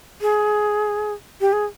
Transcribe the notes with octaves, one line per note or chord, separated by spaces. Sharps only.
G#4
G4
G#4